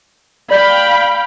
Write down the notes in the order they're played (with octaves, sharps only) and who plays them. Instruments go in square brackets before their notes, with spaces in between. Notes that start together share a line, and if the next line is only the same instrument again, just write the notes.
[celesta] D5 G6 B6 [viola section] F5 G5 B5